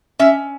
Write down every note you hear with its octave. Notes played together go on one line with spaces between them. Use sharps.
C#4 E5